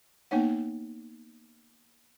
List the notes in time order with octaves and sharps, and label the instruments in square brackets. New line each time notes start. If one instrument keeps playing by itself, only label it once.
[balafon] A#3 B3 D#4 C#5 F#5